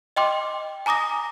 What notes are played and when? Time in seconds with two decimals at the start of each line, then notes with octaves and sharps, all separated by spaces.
0.16 D#5 G5 C6 D6
0.86 G#5 A#5 D6 D#6 A#6